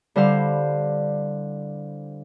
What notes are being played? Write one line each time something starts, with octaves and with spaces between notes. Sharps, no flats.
D3 G3 E4 C5 F5